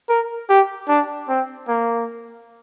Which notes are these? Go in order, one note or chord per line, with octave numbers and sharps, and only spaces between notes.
A#4
G4
D4
C4
A#3